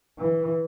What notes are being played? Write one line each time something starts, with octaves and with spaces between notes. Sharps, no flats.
E3